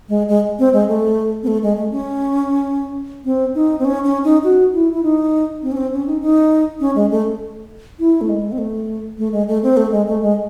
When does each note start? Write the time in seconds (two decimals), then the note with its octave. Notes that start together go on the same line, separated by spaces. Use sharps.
0.09 G#3
0.28 G#3
0.59 C4
0.73 G#3
0.88 A3
1.43 C4
1.47 A3
1.63 G#3
1.77 A3
1.91 C#4
3.25 C4
3.55 D#4
3.79 C4
3.85 C#4
4.04 C#4
4.24 D#4
4.44 F#4
4.74 E4
4.93 E4
5.03 D#4
5.62 C4
5.72 C#4
5.77 C4
5.93 C#4
6.07 D#4
6.22 D#4
6.80 C#4
6.96 G#3
7.11 A3
7.99 E4
8.21 A3
8.29 G#3
8.52 C4
8.58 A3
9.18 A3
9.32 G#3
9.48 A3
9.63 C4
9.77 A3
9.92 G#3
10.07 A3
10.22 G#3